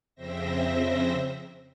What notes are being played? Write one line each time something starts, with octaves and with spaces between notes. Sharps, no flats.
F2 C#3 C4 C5 E5 A#6